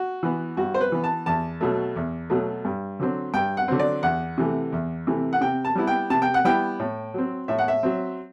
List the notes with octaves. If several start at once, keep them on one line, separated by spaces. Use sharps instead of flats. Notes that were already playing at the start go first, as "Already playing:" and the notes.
Already playing: F#4
E3 B3
G2 F#4
C5
B4
E3 B3
A5
E2 A5
B2 F#3 A3
E2
B2 F#3 A3
G2
D3 F#3 C4
G2 G5
F#5
D3 F#3 C4
D5
E2 F#5
C3 E3 A3
E2
C3 E3 A3
F#5
C3 G5
A5
G3 B3 E4
G5
C3 A5
G5
F#5
G3 B3 E4 G5
A2
F#3 C4
A2 E5
F#5
E5
F#3 C4